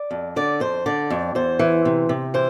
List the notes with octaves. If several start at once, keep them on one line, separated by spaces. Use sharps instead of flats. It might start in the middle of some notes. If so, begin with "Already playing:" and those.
Already playing: D5
F2
D3 D5
F2 C5
D3 D5
F2
E2 C5
E3
C3
C3
E3 C5